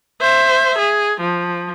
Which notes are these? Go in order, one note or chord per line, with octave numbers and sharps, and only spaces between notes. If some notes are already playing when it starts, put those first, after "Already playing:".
C5 E5
G#4
F3